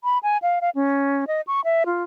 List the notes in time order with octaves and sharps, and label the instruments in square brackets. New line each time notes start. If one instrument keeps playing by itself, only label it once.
[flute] B5
G#5
F5
F5
C#4
D#5
C#6
E5
F4